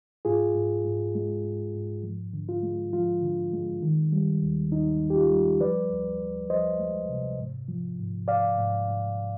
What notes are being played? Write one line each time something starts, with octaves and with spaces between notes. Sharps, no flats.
G#2 F4 G#4
G#2
G#2
G#3
G#2
G#2
F3
D3
F4
G#3
F3 F4
D3
G#3
D#3
G3
D#2
D#2 D#4
D#2
G4
F4
G3
F3 B4 D5
D2
D2
F3 C5 D#5
G#3
C3
G#2
F3
G#2
G#2 D5 F5
G#2
G#2